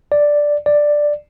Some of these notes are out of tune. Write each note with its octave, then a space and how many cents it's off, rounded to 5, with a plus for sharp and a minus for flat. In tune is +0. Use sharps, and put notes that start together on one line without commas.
D5 +0
D5 +5